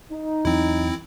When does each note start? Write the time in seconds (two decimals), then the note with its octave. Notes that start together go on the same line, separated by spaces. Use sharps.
0.12 D#4
0.45 E2 E3 F#3 C4 E4